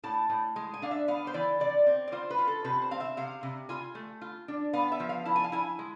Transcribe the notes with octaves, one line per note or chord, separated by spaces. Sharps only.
A2 A5
A2
G#3
G#5
D4 F5
E5
B3 F5
C5
E3 D5
C3 D5
C4
D5
F4 C5
B4
F4
A4
C3 B4
C5
C4 F5
E5
C3 F5
C3
F4 G#5
A3
F4
D4
B3 F5
E5
F3
F5
E4 A5
G#5
F5
E4 G#5
G#3